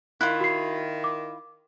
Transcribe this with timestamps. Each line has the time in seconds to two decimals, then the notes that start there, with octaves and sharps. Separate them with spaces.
0.21 D#3 E4 F4 F#6
0.41 F#4 C7
1.04 D6